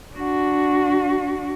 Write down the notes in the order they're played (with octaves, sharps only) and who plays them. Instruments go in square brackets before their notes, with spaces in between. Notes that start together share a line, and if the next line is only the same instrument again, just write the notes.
[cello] D4 F#4